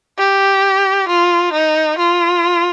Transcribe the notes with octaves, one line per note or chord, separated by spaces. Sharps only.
G4
F4
D#4
F4